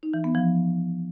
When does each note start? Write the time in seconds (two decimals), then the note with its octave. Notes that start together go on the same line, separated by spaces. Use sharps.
0.03 D#4
0.14 E3
0.24 B3
0.35 F3